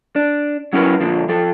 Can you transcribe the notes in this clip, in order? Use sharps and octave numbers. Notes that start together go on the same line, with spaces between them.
D4
F#3 C#4 E4 G4 A#4 B4
A#2 D3 F3
F3 A4